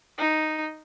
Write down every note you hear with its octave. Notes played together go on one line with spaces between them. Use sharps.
D#4